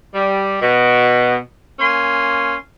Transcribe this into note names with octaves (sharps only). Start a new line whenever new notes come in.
G3
B2
A#3 C#4 G#5 C6